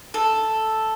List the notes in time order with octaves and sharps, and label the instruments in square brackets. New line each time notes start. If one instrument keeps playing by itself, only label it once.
[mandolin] A4